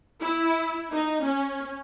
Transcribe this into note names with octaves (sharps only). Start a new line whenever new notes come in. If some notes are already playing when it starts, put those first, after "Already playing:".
E4
D#4
C#4